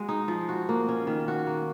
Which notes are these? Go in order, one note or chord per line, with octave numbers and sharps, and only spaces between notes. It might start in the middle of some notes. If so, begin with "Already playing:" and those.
Already playing: G#3 F#4
D#4
F3
F#4
A#3
C#4
D#3
F#4
A#3